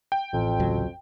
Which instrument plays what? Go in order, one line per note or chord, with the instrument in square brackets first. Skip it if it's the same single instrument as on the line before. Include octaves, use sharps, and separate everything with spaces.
[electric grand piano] G5
[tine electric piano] A1 A2 [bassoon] F2
[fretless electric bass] D2 C#3 F#3